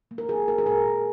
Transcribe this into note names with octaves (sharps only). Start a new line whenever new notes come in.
A#3
A#4
D#3 G#4
A#3 A#4
G#4
A#2 A#4